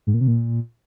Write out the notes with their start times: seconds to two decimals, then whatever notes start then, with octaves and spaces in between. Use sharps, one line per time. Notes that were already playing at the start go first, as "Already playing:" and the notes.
0.07 G#2
0.14 A#2
0.21 C3
0.28 A#2